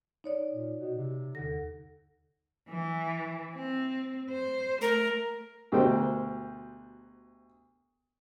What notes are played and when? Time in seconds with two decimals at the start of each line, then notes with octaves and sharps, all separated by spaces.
0.24 D#4 C#5 D5
0.52 A#2
0.78 B2
0.98 C3
1.35 D#2 D3 A#6
2.70 E3
3.55 C4
4.31 C5
4.82 A3 A#4
5.72 D2 B2 G4 A#4 C5 G5